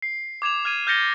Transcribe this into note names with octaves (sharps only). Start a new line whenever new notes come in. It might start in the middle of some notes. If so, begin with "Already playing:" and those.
C7
D6 G#6 E7 F7
F6 G#6 D#7
F6 G6 A6 A#6 C#7 G7